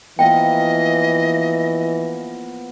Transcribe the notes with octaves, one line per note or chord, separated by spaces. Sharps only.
E3 F3 A#3 B3 D#5 G5